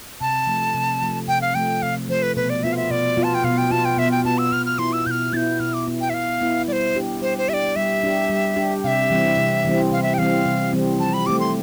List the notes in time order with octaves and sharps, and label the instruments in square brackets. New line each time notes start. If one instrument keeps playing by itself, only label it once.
[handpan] C3 [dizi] A5
[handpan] F3 A3
C3
F3 A3
[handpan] C3 [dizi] G5
[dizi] F5
[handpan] F3 A3 [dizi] G5
[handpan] C3 [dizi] F5
[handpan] F3 A3 [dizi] C5
[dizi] B4
[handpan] B2 [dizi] B4
[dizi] D5
[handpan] B3 F4 [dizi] E5
[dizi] F5
E5
[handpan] B2 [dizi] D5
[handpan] B3 F4
[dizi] A5
G5
[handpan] B2 [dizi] F5
[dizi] G5
[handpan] B3 F4 [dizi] A5
[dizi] G5
[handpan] B2 [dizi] E5
[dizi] G5
[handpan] B3 F4 [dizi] A5
[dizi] E6
[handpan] B2 [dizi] F6
[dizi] F6
[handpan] B3 E4 [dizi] C6
[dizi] E6
[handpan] B2 [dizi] F6 G6
[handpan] B3 E4 [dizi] G6 A6
[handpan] B2 [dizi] F6
[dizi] D6
[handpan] B3 E4
[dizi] G5
E5
[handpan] B2 [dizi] F5
[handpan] B3 E4
[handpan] G3 [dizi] C5 D5
[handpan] D4 G4
[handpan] G3 [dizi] C5
[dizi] C5
[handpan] D4 G4 [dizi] D5 E5
[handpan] G3 [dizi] E5
[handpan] D4 G4
G3
D4 G4
[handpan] C3 [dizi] E5 F5
[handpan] E3 G3 C4
C3
E3 G3 C4
[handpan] C3 [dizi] F5
[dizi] E5
G5
[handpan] E3 G3 C4 [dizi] F5
[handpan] C3
E3 G3 C4
[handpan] F3 [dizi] A5
[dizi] B5
[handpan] A3 C4 G4 [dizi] D6
[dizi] C6